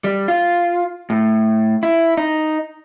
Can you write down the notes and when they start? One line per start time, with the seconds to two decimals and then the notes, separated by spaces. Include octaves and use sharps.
0.04 G3
0.28 F4
1.10 A2
1.83 E4
2.17 D#4